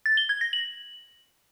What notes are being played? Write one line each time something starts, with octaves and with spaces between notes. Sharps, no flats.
A6
G7
G#6
A#6
F#7